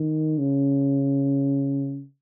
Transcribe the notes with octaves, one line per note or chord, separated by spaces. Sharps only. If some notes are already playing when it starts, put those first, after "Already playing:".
Already playing: D#3
C#3